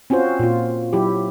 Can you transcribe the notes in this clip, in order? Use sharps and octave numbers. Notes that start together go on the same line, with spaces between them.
C4 C#4 F4 F#4 C5
A#2 F4
F#3 E4 G4